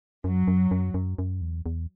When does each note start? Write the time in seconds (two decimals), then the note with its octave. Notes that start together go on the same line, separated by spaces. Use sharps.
0.24 F#2 F#3
0.48 F#2
0.71 F#2
0.94 F#2
1.18 F#2
1.41 E2
1.66 E2